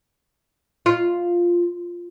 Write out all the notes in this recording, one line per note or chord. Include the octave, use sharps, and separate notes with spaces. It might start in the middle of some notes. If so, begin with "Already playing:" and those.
F4